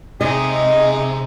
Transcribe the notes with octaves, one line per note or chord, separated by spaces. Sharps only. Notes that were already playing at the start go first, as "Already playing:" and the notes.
C3 G#3 D#4 G#4 D#5